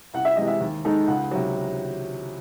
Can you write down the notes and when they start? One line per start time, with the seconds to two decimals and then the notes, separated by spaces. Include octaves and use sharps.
0.14 C2 F#5
0.25 E5
0.36 C3 E3 G#3 D#5
0.47 E5
0.61 D#2
0.85 D#3 G#3 D#4 A4
1.07 C#2 F#5
1.31 C3 F#3